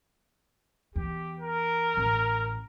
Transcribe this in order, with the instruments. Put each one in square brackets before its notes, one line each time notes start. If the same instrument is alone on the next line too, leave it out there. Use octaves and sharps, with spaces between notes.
[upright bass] E2 [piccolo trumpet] G4
[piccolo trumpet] A#4
[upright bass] A1